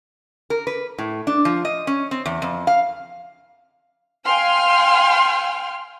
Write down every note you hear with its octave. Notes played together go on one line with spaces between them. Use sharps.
A#4
B4
A2
D4
F3
D#5
C#4
C4
E2
F2
F5
F5 G5 G#5 C6 F6